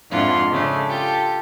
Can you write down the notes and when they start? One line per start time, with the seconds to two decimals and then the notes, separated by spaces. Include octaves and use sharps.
0.10 F2 G#2 D4 E4 F4 F#5
0.51 C#3 G#3 A3 D4
0.88 F4 G4 A4